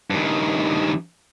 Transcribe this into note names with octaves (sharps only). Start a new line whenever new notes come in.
G2 D#3